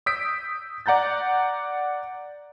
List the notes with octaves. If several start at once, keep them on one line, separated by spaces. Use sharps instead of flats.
D#6 E6 G6 B6 D7
D5 F#5 A#5 G6 A6